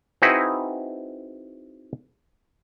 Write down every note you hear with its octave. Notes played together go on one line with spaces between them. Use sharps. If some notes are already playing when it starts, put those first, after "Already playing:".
C4 D#4 E4 F#4 G#4 B4